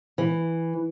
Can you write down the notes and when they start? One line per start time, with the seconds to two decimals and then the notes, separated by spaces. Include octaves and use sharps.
0.18 E3